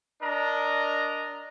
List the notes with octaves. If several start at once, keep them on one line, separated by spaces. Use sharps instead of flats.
D4 A#4 D#5 A#5